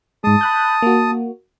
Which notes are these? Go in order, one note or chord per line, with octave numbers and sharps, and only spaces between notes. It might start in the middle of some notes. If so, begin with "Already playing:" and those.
G#2 G#3 A5 D#6
B5 F#6 G6
A#3 F#4